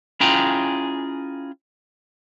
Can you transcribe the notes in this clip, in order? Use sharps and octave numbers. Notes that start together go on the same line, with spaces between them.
C#4 E4 F4 G#4 G5 A#5